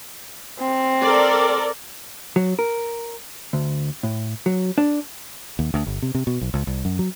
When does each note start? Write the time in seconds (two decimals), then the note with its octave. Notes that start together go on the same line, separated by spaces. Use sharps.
0.60 C4
1.02 A4 A#4 D5
2.36 F#3
2.59 A#4
3.53 D2
4.03 A2
4.46 F#3
4.78 D4
5.59 D#2
5.74 D2
5.87 G1
6.02 C3
6.15 C3
6.27 B2
6.41 B1
6.54 C#2
6.67 C2
6.85 F#2
6.99 F#3